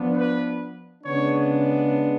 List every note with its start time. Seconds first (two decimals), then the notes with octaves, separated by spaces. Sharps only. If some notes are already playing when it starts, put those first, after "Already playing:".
Already playing: F3 B3 D4
0.16 B4
1.03 C#3 G#3 B3 D4 C#5